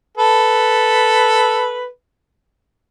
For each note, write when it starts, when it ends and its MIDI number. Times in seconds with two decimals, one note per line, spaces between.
0.18 1.86 69
0.18 1.86 71